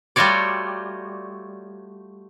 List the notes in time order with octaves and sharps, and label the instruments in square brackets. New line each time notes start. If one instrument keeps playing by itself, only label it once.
[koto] G3 A3 F4 F#4 C#5 D5